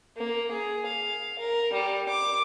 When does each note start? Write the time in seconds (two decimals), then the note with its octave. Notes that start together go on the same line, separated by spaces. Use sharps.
0.16 A#3
0.52 G#4
0.86 F5
1.38 A#4
1.73 G3
2.09 D6